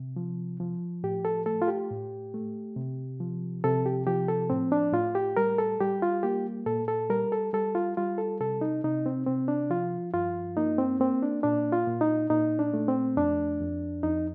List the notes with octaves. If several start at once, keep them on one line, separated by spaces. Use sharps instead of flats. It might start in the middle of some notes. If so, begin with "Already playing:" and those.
Already playing: C3
F3
F3
A2 G4
A4
A3 A4
F4
G4
A2
A3
C3
F3
C3 A4
G4
F3 G4
A4
A2 C4
D4
A2 F4
G4
G3 A#4
A4
G3 G4
F4
A#3 G4
A#2 A4
A4
G3 A#4
A4
G3 A4
F4
G3 F4
A4
C3 A4
D#4
C3 D#4
C4
C3 C4
D4
F3 F4
G2 F4
A#3 D#4
C4
A#3 C4
D4
A#2 D4
F4
A#2
D#4
A#2 D#4
D4
A3
C4
F2 D4
F2
F2 D#4